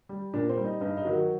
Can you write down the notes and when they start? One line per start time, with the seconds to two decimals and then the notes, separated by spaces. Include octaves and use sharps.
0.09 G3
0.33 A#2 D4
0.49 C4
0.57 G3
0.65 D#4
0.81 G2 D#4
0.97 D#4
1.05 D#3 F#3
1.13 F#4